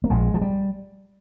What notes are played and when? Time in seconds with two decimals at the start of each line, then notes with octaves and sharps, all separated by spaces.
0.04 A#3
0.10 A#1 G#3
0.34 F3
0.41 G3